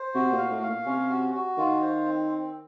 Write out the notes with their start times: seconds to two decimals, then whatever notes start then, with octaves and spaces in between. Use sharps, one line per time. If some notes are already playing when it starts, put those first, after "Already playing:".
Already playing: C5
0.14 C3 F#4
0.32 A#2
0.38 F5
0.51 A2
0.62 F5
0.68 A#2
0.85 C3 C#4
1.10 F#4
1.34 F#4
1.58 D#3 F4
1.82 C5
2.06 C4
2.29 C4